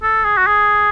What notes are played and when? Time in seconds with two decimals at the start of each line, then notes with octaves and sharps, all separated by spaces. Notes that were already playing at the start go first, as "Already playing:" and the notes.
0.03 A4
0.25 G#4
0.38 F#4
0.47 G#4